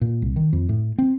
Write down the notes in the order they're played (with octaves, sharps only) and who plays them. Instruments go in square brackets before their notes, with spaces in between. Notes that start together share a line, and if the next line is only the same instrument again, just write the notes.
[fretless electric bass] A#2
C2
D#3
F2
A2
C4